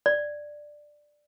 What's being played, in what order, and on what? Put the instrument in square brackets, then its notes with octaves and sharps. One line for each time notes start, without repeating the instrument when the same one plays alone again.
[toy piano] D5